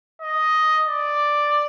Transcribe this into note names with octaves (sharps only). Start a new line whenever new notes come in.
D#5
D5